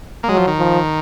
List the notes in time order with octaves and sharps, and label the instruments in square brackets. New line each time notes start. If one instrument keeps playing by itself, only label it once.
[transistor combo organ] A#3
[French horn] F#3 [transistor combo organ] G#3
[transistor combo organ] F3
D#3
[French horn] F3